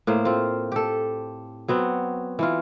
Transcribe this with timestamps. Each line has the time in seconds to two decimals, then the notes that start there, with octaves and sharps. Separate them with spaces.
0.07 A2 A#3 C5
0.25 C4 F4
0.72 G4 A4
1.68 F#3 B3 C4
2.39 E3 E4 F4